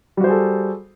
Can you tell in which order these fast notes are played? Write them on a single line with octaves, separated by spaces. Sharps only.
G3 F#4 C5 G#4 A4